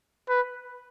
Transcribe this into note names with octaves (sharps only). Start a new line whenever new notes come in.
B4